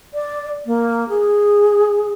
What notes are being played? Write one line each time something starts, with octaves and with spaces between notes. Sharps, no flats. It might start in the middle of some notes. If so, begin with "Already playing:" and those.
D5
A#3
G#4